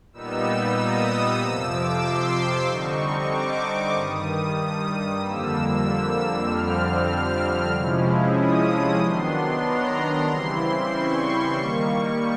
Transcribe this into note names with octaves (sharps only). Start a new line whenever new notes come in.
A#2 G3 B3 D#4 E6
D#6
D#6
F2 C3 F3 E6
D6
C6
D3 G3 C4 D#4 C#6
D6
G2 D#3 G3 D#6
D#6
F2 D3 G3 A#3 E6
E6
F2 D3 G3 C4 F6
C3 F3 G#3 C#4 E4
D#6
D#3 F#3 B3 D4 C6
A#5
C#3 E3 G3 C4 E4 C6
C#6
D#3 G3 A#3